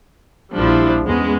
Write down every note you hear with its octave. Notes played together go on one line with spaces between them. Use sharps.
A#1 F3 G3 D4 E4
E2 G#3 B3 C#4